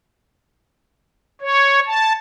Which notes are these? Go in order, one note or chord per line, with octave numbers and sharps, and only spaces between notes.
C#5
A5